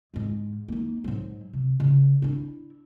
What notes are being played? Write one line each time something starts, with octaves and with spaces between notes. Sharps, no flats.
E2 G#2
A#3 D#4
G#2 F#3
C3
C#3
D4 E4